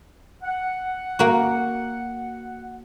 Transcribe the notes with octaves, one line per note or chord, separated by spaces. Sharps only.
F#5
A#3 F#4